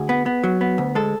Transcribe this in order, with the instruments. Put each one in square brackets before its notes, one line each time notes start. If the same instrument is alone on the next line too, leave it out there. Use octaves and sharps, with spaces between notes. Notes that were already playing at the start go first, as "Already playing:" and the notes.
Already playing: [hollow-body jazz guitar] D2 G#4
B3
B3
F#3
B3
D2
G#3 A4